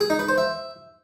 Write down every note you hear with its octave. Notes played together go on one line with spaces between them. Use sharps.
G#4
D#4
B4
C5
E5